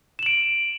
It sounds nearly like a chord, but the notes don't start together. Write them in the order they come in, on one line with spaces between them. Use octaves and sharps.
E7 F#7 D7